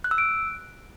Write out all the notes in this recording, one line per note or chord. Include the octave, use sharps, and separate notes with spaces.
F#6
E6
D7